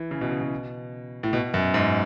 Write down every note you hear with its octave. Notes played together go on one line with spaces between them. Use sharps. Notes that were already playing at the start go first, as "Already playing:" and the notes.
Already playing: E3
C#3
B2
C#3
B2
A2
B2
F#2
G#2